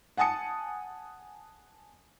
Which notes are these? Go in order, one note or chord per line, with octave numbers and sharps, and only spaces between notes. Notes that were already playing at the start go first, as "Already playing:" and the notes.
F#5 G#5 A5 D#6 C#7